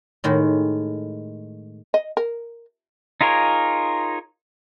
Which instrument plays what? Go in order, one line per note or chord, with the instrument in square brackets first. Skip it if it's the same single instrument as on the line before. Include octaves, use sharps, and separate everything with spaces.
[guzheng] A2 D#3 G#3
[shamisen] D#5
A#4
[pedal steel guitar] D#4 F4 G#4 A#4 C#5